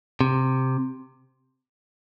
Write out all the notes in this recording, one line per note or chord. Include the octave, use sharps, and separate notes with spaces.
C3